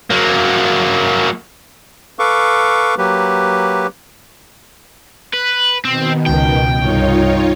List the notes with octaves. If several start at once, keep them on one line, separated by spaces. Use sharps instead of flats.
F#3 A#3
A4 B4 F5 C#6 D6
F#3 A#3 G4 B4
B4
B2 D#3 C4
C#2 G5
C2 G2 D#4 F4 C#5